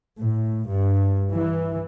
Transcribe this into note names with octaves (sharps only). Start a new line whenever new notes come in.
A2
G2
E3